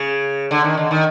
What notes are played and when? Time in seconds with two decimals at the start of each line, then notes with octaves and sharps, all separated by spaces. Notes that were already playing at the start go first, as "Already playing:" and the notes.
Already playing: C#3
0.51 D3
0.64 D#3
0.77 D3
0.91 D#3